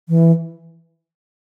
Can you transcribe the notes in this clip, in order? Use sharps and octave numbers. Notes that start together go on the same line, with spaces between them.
E3